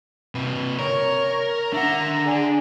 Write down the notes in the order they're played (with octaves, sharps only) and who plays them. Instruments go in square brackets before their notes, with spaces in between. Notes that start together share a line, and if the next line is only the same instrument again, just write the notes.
[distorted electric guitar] C3 B4
[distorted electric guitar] A#4 [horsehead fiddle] C#5
[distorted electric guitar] D4 F#5 [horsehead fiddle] E5 A#5
[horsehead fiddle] G#4 D5